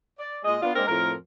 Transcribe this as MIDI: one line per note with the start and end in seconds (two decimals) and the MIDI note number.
0.20 0.39 74
0.44 0.56 46
0.44 0.56 56
0.44 0.56 68
0.44 0.56 75
0.62 0.71 59
0.62 0.71 62
0.62 0.71 65
0.75 0.83 56
0.75 0.83 58
0.75 0.83 60
0.75 0.83 62
0.75 0.83 70
0.87 1.12 41
0.87 1.12 45
0.87 1.12 70